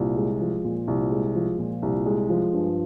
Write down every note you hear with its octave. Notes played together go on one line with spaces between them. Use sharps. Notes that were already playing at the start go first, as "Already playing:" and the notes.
Already playing: C2 A#2
G#3
F3
A#2
C2
G#3
F3
A#2
C2
G#3
F3
G2